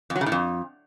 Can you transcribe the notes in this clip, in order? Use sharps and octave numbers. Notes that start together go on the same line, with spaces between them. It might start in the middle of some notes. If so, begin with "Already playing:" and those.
F2
F#3
C#3
A2
F2